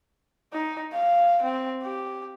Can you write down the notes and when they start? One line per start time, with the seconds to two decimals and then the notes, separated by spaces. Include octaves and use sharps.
0.53 D#4
0.93 F5
1.43 C4
1.83 G4